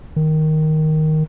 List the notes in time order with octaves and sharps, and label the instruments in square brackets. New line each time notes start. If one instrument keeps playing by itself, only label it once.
[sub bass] D#3